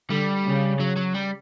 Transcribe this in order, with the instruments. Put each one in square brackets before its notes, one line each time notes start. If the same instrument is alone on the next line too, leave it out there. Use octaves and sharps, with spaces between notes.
[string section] D3 [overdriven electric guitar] G3
[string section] C#3
[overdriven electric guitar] F#3
F#3
G3